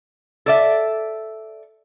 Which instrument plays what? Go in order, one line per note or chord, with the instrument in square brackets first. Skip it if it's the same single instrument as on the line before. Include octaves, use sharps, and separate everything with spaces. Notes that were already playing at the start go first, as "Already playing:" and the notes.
[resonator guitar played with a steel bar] A4 D5 E5